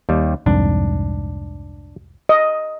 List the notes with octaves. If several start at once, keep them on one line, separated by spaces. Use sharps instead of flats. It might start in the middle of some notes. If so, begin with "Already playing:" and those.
D#2 G3
C2 F2 G#2 D4
D#5